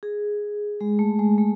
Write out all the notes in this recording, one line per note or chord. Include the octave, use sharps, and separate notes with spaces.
G#4
G#3
A3
G#3
A3